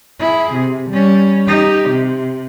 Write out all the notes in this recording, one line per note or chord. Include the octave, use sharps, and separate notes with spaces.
E4 G#4
C3
G3 C#4
D#4 G4
C3